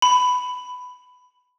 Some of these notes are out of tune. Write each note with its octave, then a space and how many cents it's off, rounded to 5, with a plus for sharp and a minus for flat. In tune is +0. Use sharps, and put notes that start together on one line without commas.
B5 +10